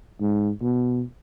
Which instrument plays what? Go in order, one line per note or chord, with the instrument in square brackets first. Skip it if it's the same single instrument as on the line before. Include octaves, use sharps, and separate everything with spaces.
[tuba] G#2
B2